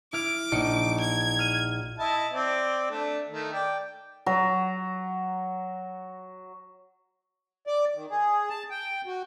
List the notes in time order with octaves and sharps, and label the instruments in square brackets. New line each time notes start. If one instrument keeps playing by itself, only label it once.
[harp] E4 F6 [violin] D6
[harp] A#1 D#4 C#7
[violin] G#6
[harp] F6 D#7
[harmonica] E4 D#5 A5
C4 D5
A3 D4
D#3 A3
D5 G5
[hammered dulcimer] F#3 A#5
[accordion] D5
D#3
G#4
A5
G5
F#4